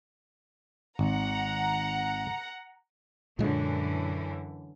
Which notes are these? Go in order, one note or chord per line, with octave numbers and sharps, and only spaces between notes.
G#1 F#5 A#5
F#2 A#2 D3 E3 G#3 D4